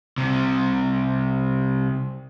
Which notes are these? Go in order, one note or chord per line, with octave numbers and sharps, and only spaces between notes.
C2 C3